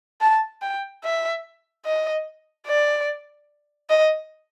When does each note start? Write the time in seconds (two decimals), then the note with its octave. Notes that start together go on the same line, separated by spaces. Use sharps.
0.21 A5
0.62 G5
1.04 E5
1.85 D#5
2.67 D5
3.90 D#5